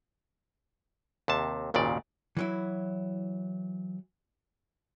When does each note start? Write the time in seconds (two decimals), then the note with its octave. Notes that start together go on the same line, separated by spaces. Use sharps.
1.28 D#2 C3 A5
1.74 G#1 D#2 A#2 C#3 D5
2.37 E3 F#3 E4